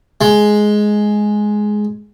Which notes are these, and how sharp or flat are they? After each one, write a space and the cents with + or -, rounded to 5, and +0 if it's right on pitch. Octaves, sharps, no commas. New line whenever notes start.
G#3 +10